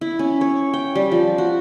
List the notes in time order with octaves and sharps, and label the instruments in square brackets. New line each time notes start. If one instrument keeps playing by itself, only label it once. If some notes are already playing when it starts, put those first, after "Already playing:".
[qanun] E4
C#4
C#5
G5
G3
F3
F#4